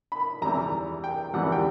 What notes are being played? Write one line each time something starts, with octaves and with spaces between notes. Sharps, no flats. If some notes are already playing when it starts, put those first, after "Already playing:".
B5
E2 C3 E3 G3 A#5
G5
E2 C3 E3 G3 F#5
G5